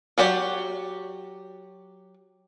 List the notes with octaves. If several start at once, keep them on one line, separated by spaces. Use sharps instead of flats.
F#3 F#4 G4 D5